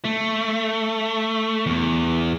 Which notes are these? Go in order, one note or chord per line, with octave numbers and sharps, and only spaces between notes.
A3
E2